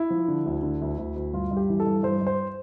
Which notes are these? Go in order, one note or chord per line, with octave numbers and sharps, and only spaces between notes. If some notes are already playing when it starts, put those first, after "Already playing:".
Already playing: E4
F3
D3
D2
D3
D2
D2
D2
G2 F4
G2
G4
E3
A4
G2
G2 C5
G2
C5